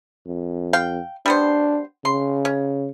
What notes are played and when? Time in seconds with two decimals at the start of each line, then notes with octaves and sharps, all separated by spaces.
0.27 F2
0.73 F5 G5
1.26 G3 B3 D4 C5
2.05 C#3 C6
2.45 C#4